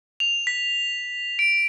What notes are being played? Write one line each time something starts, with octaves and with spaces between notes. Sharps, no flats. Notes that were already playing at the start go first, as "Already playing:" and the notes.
F7
B6
D7